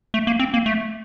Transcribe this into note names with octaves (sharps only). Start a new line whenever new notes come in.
A3
A#3
C4
A#3
A3